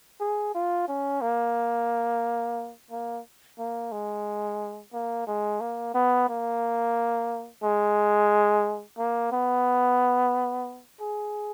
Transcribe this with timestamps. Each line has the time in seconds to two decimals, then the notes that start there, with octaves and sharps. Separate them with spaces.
0.21 G#4
0.55 F4
0.88 C#4
1.21 A#3
2.91 A#3
3.58 A#3
3.92 G#3
4.93 A#3
5.27 G#3
5.60 A#3
5.95 B3
6.29 A#3
7.63 G#3
8.98 A#3
9.32 B3
11.01 G#4